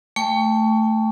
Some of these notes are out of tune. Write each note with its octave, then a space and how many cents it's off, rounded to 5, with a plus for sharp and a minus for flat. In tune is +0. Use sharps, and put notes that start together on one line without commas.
A3 +0 G5 +25 C#6 +20